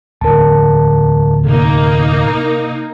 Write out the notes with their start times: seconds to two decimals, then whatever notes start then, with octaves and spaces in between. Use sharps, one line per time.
0.21 D1 E2 A#4 A5
1.45 C3 A#3 D#4